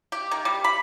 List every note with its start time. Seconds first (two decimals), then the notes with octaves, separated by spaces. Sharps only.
0.12 G4
0.31 D#3
0.45 G3
0.64 B5